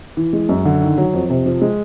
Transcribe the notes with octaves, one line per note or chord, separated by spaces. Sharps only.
E3
G#3
F#2
D3
D#3
F#3
F2
C3
F3
G#3